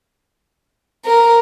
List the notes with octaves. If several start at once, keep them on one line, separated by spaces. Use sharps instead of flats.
A#4